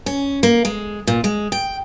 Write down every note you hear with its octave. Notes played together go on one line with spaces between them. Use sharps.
C#4
A#3
G#3
A#2
G#3
G5